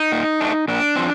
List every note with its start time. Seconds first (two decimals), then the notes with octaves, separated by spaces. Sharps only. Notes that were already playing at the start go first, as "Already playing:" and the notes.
Already playing: D#4
0.12 A#2
0.40 A3 D4
0.68 A#2 D4
0.95 F3 C4